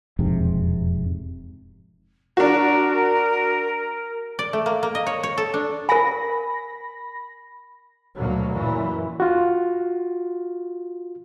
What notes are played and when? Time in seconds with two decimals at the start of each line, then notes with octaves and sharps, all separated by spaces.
0.19 E1 F2 G#2 C3
2.37 D4 F#4 A#4
4.39 D5
4.53 A3
4.66 A#3
4.83 A#3
4.95 D#5
5.07 C#5
5.23 C#5
5.38 A4
5.54 D4
5.89 A#4 G#5 B5 A#6
8.17 D2 B2 F#3 A#3
8.56 F#2 A#2 E3
9.20 F4 F#4